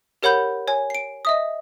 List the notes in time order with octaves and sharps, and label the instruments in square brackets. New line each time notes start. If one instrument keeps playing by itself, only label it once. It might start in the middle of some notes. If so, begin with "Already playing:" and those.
[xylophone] G4 A#4 C#5 F#5 B5 G6
C#5 G#5
C7 D7
D#5 E5 D#6